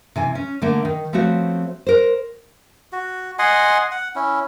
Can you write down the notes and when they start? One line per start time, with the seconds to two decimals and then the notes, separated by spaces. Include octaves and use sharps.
0.16 C3 E3 G#5
0.35 C#4
0.62 D3 A3 A#3
0.85 D#3
1.13 F3 A3 B3 C4 F#4 C#5
1.87 A#4 C5
2.92 F#4
3.39 D#5 F#5 G#5 C6
3.91 F#5
4.15 C#4 E4